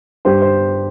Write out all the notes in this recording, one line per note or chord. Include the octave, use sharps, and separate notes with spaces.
G2 G4 C5
C5